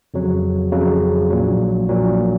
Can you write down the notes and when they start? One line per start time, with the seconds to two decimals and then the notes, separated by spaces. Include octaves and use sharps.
0.14 F2 C#3 F#3
0.72 F2 C#3 F#3
1.30 A#1 A#2 F#3
1.89 A#1 A#2 F#3